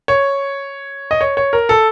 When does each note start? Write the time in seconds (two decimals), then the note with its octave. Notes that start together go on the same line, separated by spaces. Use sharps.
0.08 C#5
1.11 D#5
1.21 C#5
1.37 C#5
1.53 A#4
1.69 A4